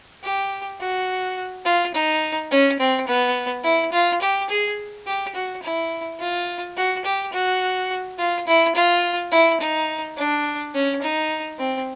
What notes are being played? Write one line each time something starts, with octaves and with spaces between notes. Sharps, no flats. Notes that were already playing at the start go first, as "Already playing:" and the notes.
G4
F#4
F4
D#4
C#4
C4
B3
E4
F4
G4
G#4
G4
F#4
E4
F4
F#4
G4
F#4
F4
E4
F4
E4
D#4
D4
C#4
D#4
C4